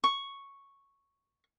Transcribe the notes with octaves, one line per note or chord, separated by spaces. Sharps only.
C#6